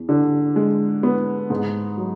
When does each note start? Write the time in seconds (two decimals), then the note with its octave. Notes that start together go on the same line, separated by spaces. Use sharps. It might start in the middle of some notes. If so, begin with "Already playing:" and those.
Already playing: E2
0.09 D3
0.56 G#3
1.03 B3
1.50 G#2
1.97 F#3